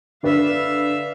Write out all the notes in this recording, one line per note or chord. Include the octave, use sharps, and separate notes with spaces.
D3 B4 D5 E5 F5